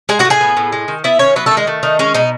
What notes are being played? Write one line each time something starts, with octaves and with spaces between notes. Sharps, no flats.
G#3 G#4 G#5
F#4 F#5
A2
G#4 G#5
B3
A2
G#3
D#3
B3 E4 E5
D#3 C#4 C#5
F#3 B3 B4
D#3 A3 A4
G#3 G#4
A3
D#3 D#4
G#3 C#4
B2 D#4